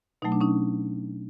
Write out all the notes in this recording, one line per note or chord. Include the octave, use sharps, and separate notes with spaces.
B2 F#3 A3 D#4
D4
C#4 D#4